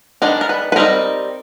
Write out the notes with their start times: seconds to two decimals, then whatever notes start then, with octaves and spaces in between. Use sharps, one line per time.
0.22 D#3 G#3 B3 D4 A#4
0.41 A#4
0.49 B4
0.72 B4
0.76 G3 C4 D#4 A#4